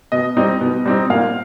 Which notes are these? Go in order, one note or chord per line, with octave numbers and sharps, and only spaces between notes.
B2 D#5
G3 C4 D#4
B2
G3 C4 D#4
A#2 F5